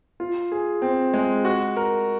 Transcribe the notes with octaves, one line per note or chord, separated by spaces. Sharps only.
F4
G#4
C4
G#3
F#4
A#4